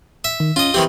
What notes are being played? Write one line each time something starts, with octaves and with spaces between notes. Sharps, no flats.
E5
D#3
C#4 F4 D#5
D#3 E3 C4 G4